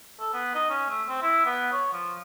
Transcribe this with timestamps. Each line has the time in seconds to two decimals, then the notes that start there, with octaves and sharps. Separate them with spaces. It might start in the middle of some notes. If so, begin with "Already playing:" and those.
0.20 A4
0.34 B3
0.54 D#4
0.70 C#4
0.90 A3
1.08 C4
1.22 E4
1.46 B3
1.72 C#5
1.93 F3